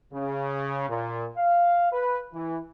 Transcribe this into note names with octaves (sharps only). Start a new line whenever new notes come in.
C#3
A#2
F5
B4
E3